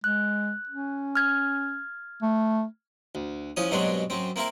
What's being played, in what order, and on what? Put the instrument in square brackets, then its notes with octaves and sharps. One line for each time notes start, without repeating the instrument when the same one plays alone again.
[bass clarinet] G#3 [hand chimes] F#6
[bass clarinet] C#4
[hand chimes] F6 G#6
[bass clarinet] A3
[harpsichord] D2
C2 F3 C#4 D#6
G2 B2 F#3 G#3 C4 D4
F#2 C4
A#3 C4 E4 A#4